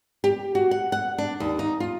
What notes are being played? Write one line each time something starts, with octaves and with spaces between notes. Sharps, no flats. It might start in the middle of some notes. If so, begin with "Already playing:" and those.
G4
F#4
F#5
F#5
D4
D#2
D#4
F4